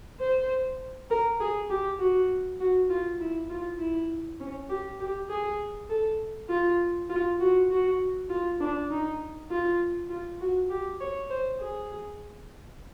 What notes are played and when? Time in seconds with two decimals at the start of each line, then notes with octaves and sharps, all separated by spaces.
0.20 C5
1.10 A#4
1.40 G#4
1.70 G4
1.99 F#4
2.60 F#4
2.90 F4
3.20 E4
3.50 F4
3.79 E4
4.40 C#4
4.69 G4
5.00 G4
5.29 G#4
5.90 A4
6.49 F4
7.10 F4
7.40 F#4
7.70 F#4
8.30 F4
8.60 D4
8.91 D#4
9.50 F4
10.10 F4
10.40 F#4
10.70 G4
11.00 C#5
11.30 C5
11.60 G#4